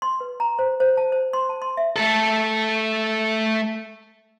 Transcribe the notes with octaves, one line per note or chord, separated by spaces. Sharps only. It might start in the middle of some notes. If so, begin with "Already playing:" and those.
C6
B4
A#5
C5
C5
A5
C5
C6
A5
C6
E5
A3 A4